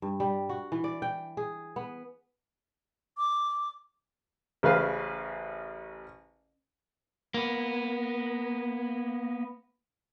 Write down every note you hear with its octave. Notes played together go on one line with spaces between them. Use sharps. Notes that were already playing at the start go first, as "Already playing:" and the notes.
G2
G3
F#4
E3
D5
G5
G#4
B3
D6
A1 C#3 G#4 B4 C5 F5
A#3 B3